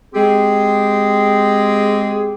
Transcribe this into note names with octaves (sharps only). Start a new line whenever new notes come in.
G#3 C4 G4 G#4